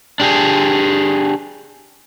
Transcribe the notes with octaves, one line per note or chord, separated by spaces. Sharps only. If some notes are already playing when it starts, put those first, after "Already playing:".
D4 G4 G#4